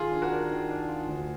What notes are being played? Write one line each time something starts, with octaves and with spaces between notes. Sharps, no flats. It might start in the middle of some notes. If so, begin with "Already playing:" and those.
Already playing: D#3 F4 G#4
D4
F#4 A#4
D4
D#3
D4
F4
D2